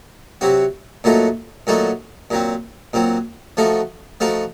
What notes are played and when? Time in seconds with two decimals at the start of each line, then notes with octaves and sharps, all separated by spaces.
0.41 C3 F#3 C4 F#4
1.04 A#2 F#3 A3 D#4 F#4
1.67 A#2 F#3 A3 D#4 F#4
2.30 A#2 F#3 C4
2.93 A#2 F#3 C4
3.57 F3 A3 D#4 F#4
4.20 F3 A3 D#4 F#4